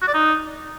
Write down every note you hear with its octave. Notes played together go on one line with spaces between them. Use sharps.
F#4
D5
D#4